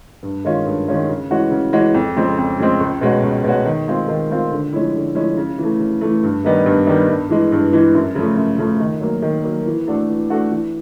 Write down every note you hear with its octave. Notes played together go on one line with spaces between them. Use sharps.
G2
D#3 G#3 C#4 F4
G2
D#3 G#3 C#4 F4
C#3
E3 G#3 C#4 F#4
C#3
E3 G#3 C#4 F#4
F2
C#3 F3 G#3 C4
F2
C#3 F3 G#3 C4
C#2
B2 G#3 C#4 F#4
C#2
B2 G#3 C#4 F#4
D#3
G#3 C4 F4
D#3
G#3 C4 F4
D3
F3 G#3 C#4 E4
D3
F3 G#3 C#4 E4
C#3
E3 A3
C#3
E3 A3
G2
D#3 G3 B3 D#4
G2
D#3 G3 B3 D#4
G2
E3 G#3
G2
E3 G#3
F#2
C#3 F3 A3
F#2
C#3 F3 A3
D#3
F#3 A#3
D#3
F#3 A#3
E3
A3 D4 F#4 A4
E3
A3 D4 F#4 A4
E3